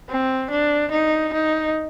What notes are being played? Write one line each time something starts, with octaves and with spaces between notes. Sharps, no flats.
C4
D4
D#4
D#4